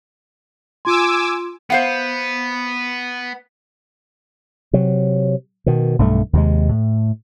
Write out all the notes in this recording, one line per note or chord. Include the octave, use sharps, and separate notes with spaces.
F4 G#5 C6 D6 E6
B3 C5 F5 F#5
C3 F#3
B2 D#3
B1 G2 G3 A3
D#2 C3 G#3
A2